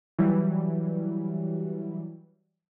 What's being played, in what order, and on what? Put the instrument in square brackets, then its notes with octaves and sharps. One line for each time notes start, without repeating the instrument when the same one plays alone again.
[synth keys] E3 F#3 G3